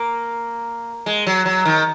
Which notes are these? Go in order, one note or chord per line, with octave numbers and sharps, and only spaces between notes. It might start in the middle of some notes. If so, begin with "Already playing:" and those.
Already playing: A#3
G#3
F#3
F#3
D#3